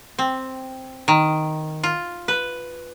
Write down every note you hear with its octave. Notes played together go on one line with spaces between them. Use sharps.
C4
D#3
F4
B4